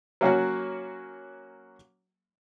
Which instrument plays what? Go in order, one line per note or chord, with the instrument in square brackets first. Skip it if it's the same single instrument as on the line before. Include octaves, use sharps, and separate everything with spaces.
[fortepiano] F#3 A#3 C#4 F#4